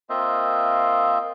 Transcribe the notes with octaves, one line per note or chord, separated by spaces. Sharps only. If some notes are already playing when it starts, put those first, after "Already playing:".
A#3 C4 F4 C5 D#5 E5